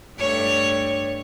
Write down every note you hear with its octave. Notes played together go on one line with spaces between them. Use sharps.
G2 A3 C#5